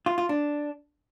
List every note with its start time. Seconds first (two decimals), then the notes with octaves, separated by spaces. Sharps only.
0.06 F4
0.18 F4
0.29 D4